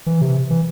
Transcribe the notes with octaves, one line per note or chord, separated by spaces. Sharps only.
E3
C3
E3